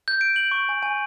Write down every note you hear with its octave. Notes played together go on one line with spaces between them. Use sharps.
G6
D7
F#7
C#6
G#5
G#5